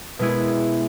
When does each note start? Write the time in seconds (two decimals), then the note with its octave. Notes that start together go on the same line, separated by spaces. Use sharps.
0.19 B2 G#3 B3 E4 G#4